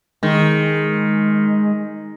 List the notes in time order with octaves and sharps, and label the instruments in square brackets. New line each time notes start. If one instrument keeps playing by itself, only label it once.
[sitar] D#3 [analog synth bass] G#3